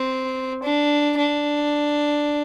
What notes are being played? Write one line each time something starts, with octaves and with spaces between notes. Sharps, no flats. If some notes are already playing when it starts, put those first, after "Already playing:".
Already playing: C4
D4
D4